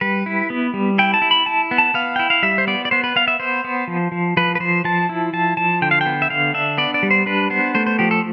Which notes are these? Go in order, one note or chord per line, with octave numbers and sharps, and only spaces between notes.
G3 B4
E4
B3
G3
E4 G5
A5
E4
B5
E4 A5
B3
A5
B3 F5
E4 G5
F5
G3 E5
C5
B3 D5
D5
B3 C5
B4
B3 F5
E5
B3 C5
B3
F3
F3
F3 B4
B4
F3 C5
F3 A5
E4
F3 A5
F3 A5
D3 G5
F5
G5
B3
E5
D3 F5
D4 E5
B3 D5
D5
G3
C5
D4 B4
B3 C5
A3 C5
C5
F3 G4
A4